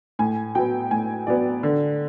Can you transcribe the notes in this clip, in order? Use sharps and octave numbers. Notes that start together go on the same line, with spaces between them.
A2 G#5
F#3 B3 G5
A2 G#5
F#3 B3 D5
D3